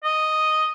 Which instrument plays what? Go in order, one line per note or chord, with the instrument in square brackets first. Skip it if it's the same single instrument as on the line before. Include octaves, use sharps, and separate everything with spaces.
[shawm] D#5